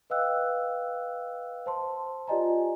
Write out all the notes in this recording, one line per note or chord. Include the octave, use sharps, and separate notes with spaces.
B4 D#5 F5 G5 E6 F#6
C5 A5 C6
F4 G4 D5 D#5 G#5 A#5